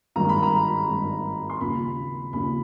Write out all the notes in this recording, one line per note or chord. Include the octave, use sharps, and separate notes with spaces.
G#1 G2 D#3 G#3 A#5
B5
A#5
G#1 G2 D#3 G#3
C6
D#2 C#3 F3 B5
D#2 C#3 F3 B5